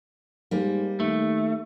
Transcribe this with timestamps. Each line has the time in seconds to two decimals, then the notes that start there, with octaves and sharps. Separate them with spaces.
0.51 G#2 G3 A#3
1.00 D#2 A3